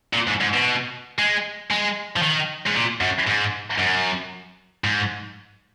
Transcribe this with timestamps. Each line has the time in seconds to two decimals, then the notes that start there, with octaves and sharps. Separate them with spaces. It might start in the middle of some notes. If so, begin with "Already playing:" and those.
0.13 A#2
0.27 G#2
0.41 G#2
0.54 B2
1.19 G#3
1.71 G#3
2.17 F3
2.22 D#3
2.66 G#2
2.75 A#2
3.01 F#2
3.27 G#2
3.79 F#2
4.84 G#2